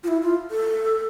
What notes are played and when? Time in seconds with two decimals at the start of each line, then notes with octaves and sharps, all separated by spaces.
0.04 F4
0.08 E4
0.22 F4
0.51 A4